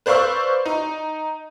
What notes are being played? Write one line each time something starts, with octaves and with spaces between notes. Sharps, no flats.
B4 C5 D5 F5 C#6 E6
D#4